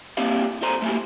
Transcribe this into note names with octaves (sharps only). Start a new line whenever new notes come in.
G3 A#3 C4 E4 G4 F5
G3 A4 C5 A#5 C6
A3 A#3 E4 F#4 G4